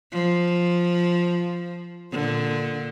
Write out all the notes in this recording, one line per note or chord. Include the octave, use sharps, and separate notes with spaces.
F3
A#2 D3